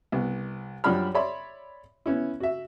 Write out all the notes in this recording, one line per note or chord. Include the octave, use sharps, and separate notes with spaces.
C2 B3
F#2 F3 G3 D4 B5 F6
C#5 D5 E5 B5 C6
B3 C#4 E4
F#4 E5